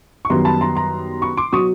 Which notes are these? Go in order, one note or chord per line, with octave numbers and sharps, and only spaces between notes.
C#6
F#2 D#3 G3 B3 A#5 C6
A5 B5
A#5 C6
A#5 C6
B5 C#6
C6 D6
B2 F#3 C#6 D#6